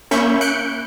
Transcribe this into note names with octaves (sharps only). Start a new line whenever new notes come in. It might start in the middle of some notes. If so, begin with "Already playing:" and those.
A#3 C#4 E5 B5 C#6 G6
F#6 G6 C#7 D7